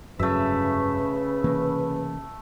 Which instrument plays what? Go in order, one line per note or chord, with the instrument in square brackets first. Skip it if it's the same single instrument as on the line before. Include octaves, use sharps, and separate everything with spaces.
[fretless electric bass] F1 G2 F#3 [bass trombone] C#3 [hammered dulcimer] A3 E5 [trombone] B4
[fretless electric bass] C3 E3 A#3